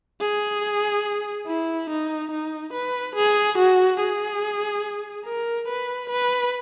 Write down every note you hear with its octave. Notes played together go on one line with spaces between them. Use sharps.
G#4
E4
D#4
D#4
B4
G#4
F#4
G#4
A#4
B4
B4